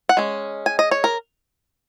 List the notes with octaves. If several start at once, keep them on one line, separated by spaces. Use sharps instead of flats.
F#5
G#3 C#4
G#5
D#5
C#5
A#4